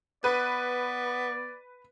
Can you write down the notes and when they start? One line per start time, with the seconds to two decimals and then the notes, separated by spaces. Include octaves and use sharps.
0.24 B3 B4 D5